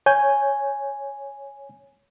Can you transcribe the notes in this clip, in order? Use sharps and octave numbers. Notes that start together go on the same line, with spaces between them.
C#5 G#5 G6